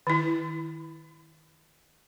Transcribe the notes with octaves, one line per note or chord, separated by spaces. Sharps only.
D#3 E4